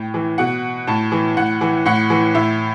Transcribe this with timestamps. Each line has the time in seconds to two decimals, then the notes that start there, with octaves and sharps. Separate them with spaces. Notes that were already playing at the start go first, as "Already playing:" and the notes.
Already playing: A2 G5
0.14 E3
0.38 B2 F#5
0.87 A2 A5
1.12 E3
1.37 A2 F#5
1.61 E3
1.85 A2 F#5
2.10 E3
2.35 A2 E5